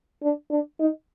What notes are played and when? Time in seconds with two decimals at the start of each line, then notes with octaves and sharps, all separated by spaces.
0.23 D4
0.51 D4
0.80 D#4